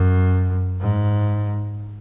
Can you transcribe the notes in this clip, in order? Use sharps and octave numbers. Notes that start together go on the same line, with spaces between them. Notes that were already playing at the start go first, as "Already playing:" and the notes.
Already playing: F#2
G#2